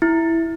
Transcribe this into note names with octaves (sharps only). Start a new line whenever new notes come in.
E4